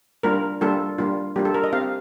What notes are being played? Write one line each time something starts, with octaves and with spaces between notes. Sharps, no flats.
G3 A#3 D4 F4 A#4
G3 A#3 D4 F4 A4
G3 A#3 D4 F4
G3 A#3 D4 F4 G4
A4
A#4
D#5
C4 G4 F5